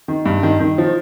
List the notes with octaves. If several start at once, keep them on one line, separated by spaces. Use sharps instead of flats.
D#3
G2
D#3
D#3
F3